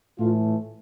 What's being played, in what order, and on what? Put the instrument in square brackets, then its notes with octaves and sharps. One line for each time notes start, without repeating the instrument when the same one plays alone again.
[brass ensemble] A2 E3 A3 F4